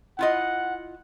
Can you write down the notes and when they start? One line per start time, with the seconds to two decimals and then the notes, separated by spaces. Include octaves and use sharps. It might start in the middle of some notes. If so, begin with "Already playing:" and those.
0.19 E4 F4 D#5 F#5